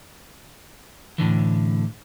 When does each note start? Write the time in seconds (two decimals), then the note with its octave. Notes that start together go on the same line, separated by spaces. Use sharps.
1.18 A2 D3 E3